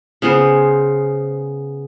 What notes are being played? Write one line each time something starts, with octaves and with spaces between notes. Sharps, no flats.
C#3 B3 G#4 C5